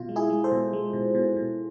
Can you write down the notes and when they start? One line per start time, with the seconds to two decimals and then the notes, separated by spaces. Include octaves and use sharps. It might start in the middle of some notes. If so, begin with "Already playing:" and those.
Already playing: B2 F4
0.09 G#3
0.16 E4 G#4
0.30 G#3
0.44 A4 C5
0.52 B2
0.73 G#3
0.93 B2
1.15 B2
1.36 B2